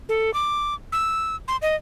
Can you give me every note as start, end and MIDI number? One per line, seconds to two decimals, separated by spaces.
0.09 0.34 69
0.34 0.75 86
0.92 1.36 88
1.48 1.57 84
1.62 1.76 75